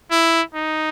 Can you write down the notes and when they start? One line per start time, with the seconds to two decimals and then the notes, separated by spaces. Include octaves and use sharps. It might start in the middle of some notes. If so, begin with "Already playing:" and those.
0.11 E4
0.54 D#4